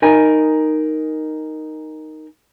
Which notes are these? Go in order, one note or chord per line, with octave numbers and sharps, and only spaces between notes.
D#4 A#4 G#5